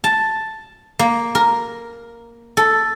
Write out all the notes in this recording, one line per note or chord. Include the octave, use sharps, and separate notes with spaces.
A5
A#3
A#4
A4